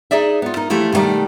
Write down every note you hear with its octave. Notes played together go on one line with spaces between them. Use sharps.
D#4 G#4 D5 E5
B3 F4
D#4 A#4
E3 F3 A3 E4 G4
B2 D3 D#3 G3 A3